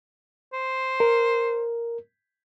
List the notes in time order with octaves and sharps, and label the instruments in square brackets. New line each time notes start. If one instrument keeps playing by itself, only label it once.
[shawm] C5
[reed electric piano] A#4